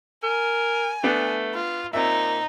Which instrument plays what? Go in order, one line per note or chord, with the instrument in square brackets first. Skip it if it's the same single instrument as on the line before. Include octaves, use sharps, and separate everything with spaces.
[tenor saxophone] A#4 [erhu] G#5
[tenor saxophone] A3 [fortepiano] B3 D4
[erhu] F4
[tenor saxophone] A#2 [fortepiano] C4 E5 [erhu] D#4